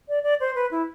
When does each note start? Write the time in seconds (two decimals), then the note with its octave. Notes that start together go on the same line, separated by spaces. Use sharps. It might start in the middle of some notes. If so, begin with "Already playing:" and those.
0.09 D5
0.23 D5
0.40 C5
0.55 B4
0.71 E4